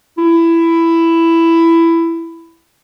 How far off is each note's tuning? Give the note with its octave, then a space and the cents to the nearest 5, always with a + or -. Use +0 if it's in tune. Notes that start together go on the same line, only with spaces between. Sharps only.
E4 +10